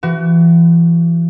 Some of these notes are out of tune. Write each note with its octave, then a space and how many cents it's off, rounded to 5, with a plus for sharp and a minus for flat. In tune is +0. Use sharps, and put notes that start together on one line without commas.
E3 +35 F#4 +30